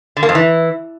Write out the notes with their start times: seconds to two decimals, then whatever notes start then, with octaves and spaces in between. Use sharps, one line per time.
0.17 D3
0.23 A#3
0.29 F2
0.35 E3